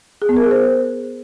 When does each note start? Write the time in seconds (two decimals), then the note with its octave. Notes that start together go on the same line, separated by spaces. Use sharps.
0.22 G#4
0.29 B3
0.36 A#4
0.44 G#4
0.51 C5